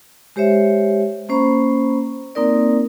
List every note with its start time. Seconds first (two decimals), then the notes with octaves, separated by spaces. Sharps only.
0.36 G#3 G4 C5 C#5 E5
1.29 A#3 C#4 C5 A#5 B5 C#6
2.35 A#3 C4 D#4 A#4 D5